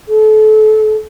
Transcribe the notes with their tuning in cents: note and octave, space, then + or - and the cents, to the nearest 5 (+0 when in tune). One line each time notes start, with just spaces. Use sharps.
A4 -30